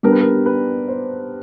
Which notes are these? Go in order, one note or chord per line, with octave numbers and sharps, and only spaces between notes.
G3 B3 D4 A#4
B4
A#4
B4
C5